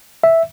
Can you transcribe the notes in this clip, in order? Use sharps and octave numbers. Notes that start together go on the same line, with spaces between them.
E5